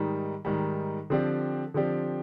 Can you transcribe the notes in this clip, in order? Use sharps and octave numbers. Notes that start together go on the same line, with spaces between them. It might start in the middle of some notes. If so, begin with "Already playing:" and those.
Already playing: G#2 D#3 G3
G#2 D#3 G3
D3 F3 C4 G4 D5
D3 F3 C4 G4 D5